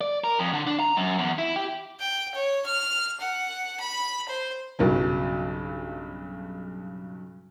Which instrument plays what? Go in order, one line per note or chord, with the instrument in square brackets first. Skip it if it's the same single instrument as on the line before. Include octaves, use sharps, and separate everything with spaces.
[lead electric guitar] D5
A#4
F2
D3
D4
A#5
F#2
E2
E4
G4
[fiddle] G5
C#5
F6
F#5
B5
C5
[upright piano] B1 G2 C#3 F#3